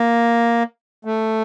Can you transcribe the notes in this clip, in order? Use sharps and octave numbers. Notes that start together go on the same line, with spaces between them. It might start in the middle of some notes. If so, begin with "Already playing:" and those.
Already playing: A#3
A3